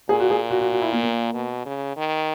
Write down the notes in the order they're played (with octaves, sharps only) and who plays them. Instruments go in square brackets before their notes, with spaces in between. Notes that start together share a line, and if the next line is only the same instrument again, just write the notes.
[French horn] A#2 [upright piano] G#4
[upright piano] F#4
G#4
F#4
F#4
F#4
E4
A#3
A#3
[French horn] B2
C#3
D#3